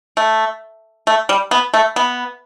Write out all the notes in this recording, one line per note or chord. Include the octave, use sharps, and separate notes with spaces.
A3
A3
G3
B3
A3
B3